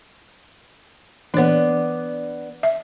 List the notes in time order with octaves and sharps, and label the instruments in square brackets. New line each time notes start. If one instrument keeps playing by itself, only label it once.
[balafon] E3 C#5 [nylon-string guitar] B3 D4
[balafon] E5